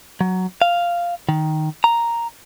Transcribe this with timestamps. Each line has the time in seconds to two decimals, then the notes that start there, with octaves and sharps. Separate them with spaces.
0.21 F#3
0.62 F5
1.29 D#3
1.84 A#5